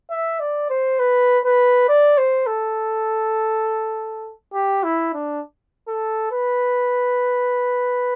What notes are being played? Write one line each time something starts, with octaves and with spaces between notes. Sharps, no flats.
E5
D5
C5
B4
B4
D5
C5
A4
G4
E4
D4
A4
B4